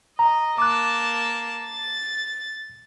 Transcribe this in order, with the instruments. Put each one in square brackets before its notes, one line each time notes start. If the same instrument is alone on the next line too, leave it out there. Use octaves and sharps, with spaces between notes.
[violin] D#5 [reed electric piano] A#5
[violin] A#3 A5 [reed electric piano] D6 F#6
[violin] A6